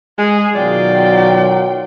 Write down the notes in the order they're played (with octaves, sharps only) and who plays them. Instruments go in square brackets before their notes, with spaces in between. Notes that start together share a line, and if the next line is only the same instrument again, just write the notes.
[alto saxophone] G#3 [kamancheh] G#4
[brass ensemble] B2 D#3 F#3 [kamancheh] F4 G5 [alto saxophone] D5